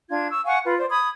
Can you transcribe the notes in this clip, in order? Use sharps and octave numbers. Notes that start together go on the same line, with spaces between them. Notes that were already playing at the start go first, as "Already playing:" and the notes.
D4 F4 G#6
C#6 E6
F5 F#5 G#5 C#6
F4 B4
C5 D5
B5 D#6 G#6